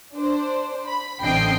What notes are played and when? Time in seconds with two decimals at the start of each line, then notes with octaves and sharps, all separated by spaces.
0.15 D4 C5
0.86 B5
1.23 A1 D3 C4 D#5 G5 C7